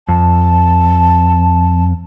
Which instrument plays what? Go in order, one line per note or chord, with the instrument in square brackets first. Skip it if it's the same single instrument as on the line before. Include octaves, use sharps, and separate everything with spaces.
[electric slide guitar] F2 [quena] A5